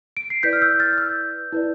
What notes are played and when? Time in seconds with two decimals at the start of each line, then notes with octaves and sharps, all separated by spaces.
0.17 D7
0.30 C7
0.43 E4 B4 D5 G6 B6
0.53 F6
0.62 E6 G6
0.79 F6 A6
0.93 F6
0.98 E6 G6
1.52 E4 B4 D5